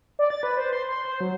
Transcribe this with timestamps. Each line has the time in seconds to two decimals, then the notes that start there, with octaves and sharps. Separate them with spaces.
0.19 D5
0.30 A6
0.43 B4
0.57 C5
0.73 C6
0.88 C6
1.05 C5
1.20 F#3